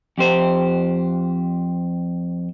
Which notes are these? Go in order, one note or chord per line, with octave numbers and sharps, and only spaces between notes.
F2 G4 C5